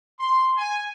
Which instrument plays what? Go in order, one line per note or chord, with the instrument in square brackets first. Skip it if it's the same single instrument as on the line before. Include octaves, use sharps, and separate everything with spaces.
[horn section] C6
G#5